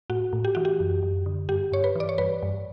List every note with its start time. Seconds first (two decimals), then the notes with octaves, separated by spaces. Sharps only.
0.10 A2 F#4
0.33 A2
0.45 G4
0.55 E3 F#4
0.65 G4
0.80 F#2
1.03 F#2
1.26 D3
1.49 G2 G4
1.72 G2 C#5
1.84 B4
1.95 E3 D5
2.09 C#5
2.18 G2 B4
2.42 G2